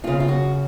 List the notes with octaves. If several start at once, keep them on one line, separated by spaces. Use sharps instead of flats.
F#2 C#3 F4
F4
F#4